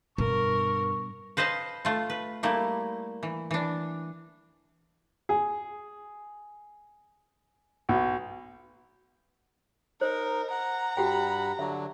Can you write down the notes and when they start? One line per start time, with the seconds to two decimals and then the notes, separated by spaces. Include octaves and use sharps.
0.18 G2 B2 A#4 C#6
1.37 B4 C5 D#5 F5 A5
1.85 A3 F4
2.10 B4
2.43 G3 A3 A#3 E4
3.23 E3
3.51 E3 D4
5.29 G#4
7.89 B1
10.01 D#4 A#4 C5
10.51 F#5 A#5
10.97 G2 F#4 G4 F#5 G5 B5
11.59 D3 F#3 E5